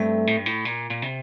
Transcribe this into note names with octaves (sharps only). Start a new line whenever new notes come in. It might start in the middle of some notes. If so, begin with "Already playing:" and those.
Already playing: G2 A3 C4
A2
G2
A2
A#2
A#2
C3